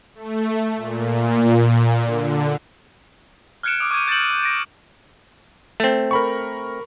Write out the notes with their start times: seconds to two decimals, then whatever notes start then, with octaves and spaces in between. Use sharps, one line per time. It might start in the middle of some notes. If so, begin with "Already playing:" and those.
0.15 A3
0.77 A#2
2.06 D3
3.63 F6 F#6 G#6 C#7 D7 E7
3.79 D6 D#6 D7
3.91 C#6 D6 F6 G6 G#6 D#7
4.08 G6 A6 C#7 E7 F#7
4.43 A6 A#6 D7
5.80 A3 C4
6.11 A#4 B5 C#6